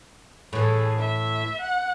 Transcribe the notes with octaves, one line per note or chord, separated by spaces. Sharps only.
A2 E3 G#4 A4
E5
F#5